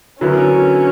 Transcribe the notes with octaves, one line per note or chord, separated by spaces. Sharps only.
D3 F#3 B3 C#4 E4 A#4